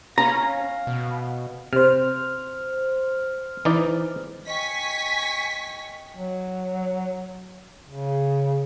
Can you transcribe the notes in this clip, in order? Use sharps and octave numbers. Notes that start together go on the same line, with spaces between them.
C#4 F5 A#5
B2
C3 C5 F6
E3 D#4 D5
D#5 G5 G#5 C#6 B6
F#3
C#3